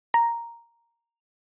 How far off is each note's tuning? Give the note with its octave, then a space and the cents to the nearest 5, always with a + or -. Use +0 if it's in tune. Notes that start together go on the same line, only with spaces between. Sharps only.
A#5 +0